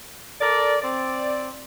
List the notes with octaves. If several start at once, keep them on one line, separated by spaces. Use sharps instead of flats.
A4 A#4 D5
C4 D5